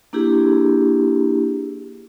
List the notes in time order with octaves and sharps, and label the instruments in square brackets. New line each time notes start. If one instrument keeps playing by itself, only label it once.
[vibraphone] A#3 D4 E4 G4 G#4